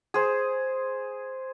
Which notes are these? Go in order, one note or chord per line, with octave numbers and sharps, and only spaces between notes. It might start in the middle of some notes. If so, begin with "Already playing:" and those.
G#4 C5